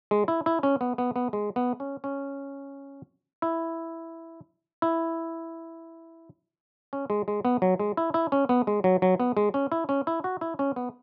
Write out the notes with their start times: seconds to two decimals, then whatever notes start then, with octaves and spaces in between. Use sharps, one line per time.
0.11 G#3
0.28 E4
0.46 E4
0.63 C#4
0.81 B3
0.98 B3
1.16 B3
1.33 G#3
1.56 B3
1.80 C#4
2.04 C#4
3.42 E4
4.82 E4
6.93 C#4
7.10 G#3
7.28 G#3
7.45 B3
7.62 F#3
7.80 G#3
7.97 E4
8.14 E4
8.32 C#4
8.49 B3
8.67 G#3
8.84 F#3
9.02 F#3
9.20 B3
9.37 G#3
9.54 C#4
9.72 E4
9.89 C#4
10.07 E4
10.24 F#4
10.41 E4
10.59 C#4
10.76 B3